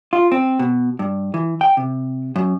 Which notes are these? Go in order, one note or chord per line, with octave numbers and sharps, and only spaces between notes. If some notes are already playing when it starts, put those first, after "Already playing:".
F4
C4
B2
G2
E3
G5
C3
F#2